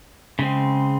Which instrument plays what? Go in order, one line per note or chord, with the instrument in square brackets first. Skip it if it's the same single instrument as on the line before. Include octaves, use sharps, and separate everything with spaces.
[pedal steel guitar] C#3 G#3 C4